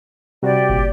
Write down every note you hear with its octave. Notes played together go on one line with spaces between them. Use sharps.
C3 G3 F#4 G4 D5
G1 A#2